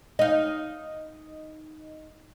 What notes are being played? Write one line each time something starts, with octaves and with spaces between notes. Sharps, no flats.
D#4 D#5 F5